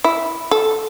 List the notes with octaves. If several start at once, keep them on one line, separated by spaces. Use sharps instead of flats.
E4
A4